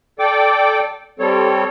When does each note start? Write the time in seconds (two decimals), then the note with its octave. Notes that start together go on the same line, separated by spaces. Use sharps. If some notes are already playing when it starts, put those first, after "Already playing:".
0.19 A4 D5 G5 D6
1.19 G3 C4 A4 C#5